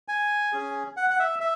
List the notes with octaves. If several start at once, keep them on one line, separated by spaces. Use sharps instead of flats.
G#5
C#4 G#4
F#5
F#5
E5
E5